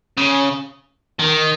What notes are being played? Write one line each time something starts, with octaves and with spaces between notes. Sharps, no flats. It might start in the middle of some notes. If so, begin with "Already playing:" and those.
C#3
D#3